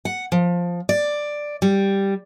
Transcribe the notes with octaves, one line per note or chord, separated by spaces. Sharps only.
F#5
F3
D5
G3